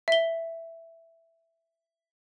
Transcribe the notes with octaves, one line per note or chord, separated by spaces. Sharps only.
E5 G7